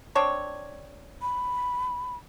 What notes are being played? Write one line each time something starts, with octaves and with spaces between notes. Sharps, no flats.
C4 D4 C#5
B5